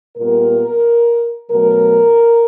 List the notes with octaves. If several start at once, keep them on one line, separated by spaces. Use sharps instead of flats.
A#2 G3 B3 A#4
B2 F#3 A3 A#4